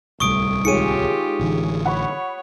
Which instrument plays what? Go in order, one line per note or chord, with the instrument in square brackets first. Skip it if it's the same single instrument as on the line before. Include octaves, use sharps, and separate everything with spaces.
[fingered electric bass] D1 C2 G3 [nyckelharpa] A3 [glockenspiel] C#6 D#6 D7
[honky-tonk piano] D#3 G#3 C#5 [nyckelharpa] F4 G4 [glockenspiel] C#7 D#7
[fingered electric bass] A1 D3 E3
[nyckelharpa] C#5 [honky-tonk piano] F#5 B5 C#6